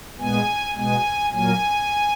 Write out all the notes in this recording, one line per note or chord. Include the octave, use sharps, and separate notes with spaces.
A#2 G#3 B3 G#5
B2 G#3 B3 G#5
A#2 F#3 A#3 G#5